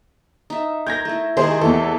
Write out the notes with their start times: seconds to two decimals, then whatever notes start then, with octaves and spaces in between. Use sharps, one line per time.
0.50 D#4 E5
0.87 A#4 G6 G#6 A#6
1.05 A3 E4
1.37 C3 D#3 G#3 G#4 C5
1.61 E2 E3 A4